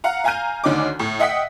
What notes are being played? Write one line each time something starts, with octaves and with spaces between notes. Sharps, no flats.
F5 F#5 A#5
F5 G#5 A#5 F6 G6 D#7
D2 D3 D#3 C#4 D#5 D6
A2
D#5 E5 F#5 G5 D#6 B6